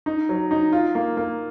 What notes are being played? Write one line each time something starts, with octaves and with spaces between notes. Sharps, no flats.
D#4
F#3
D#4
F4
A#3
A#3